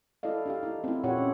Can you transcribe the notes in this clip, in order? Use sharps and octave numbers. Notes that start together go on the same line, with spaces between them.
E4 A4 D5 D#5 F5
D4 G4 F5
D#4 E4
C4 E4
A#2 E4 G4 C#5 F#5
C#4